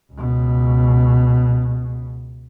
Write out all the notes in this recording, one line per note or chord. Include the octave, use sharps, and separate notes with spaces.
C#2 B2